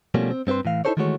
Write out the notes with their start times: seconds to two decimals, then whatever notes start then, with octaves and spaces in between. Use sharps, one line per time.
0.14 B2 F3 G3 A3 A#3 C#4
0.31 C4
0.47 G2 C4 F4 B4 C5
0.65 A2 E3 F5
0.85 D#4 E4 G4 A4 C5 C#5
0.97 D#3 E3 G#3 A3 F#4 C#5